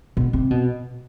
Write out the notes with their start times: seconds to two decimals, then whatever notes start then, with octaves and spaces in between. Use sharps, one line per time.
0.17 B2
0.33 C3
0.51 B2